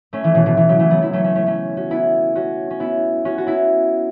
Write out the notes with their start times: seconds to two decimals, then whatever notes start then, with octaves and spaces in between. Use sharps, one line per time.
0.13 A3 C#4
0.24 E3 A3
0.35 B2 E3
0.46 B2 E3
0.57 B2 E3
0.69 C#3 F#3
0.79 E3 A3
0.91 F#3 B3
1.02 B3 E4
1.13 A3 C#4
1.24 A3 C#4
1.35 A3 C#4
1.46 A3 C#4
1.77 C#4 F#4
1.91 B3 E4
2.35 C#4 F#4
2.70 C#4
2.80 B3 E4
3.25 C#4 F#4
3.38 F#4
3.47 B3 E4